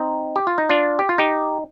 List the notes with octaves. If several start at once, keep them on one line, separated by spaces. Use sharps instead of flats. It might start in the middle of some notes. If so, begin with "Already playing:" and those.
Already playing: C4 D#4
G4
F4
D#4
D4 F4
G4
F4
D#4 G4